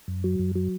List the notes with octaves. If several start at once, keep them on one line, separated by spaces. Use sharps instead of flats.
F#2
F#3
F#2
F#3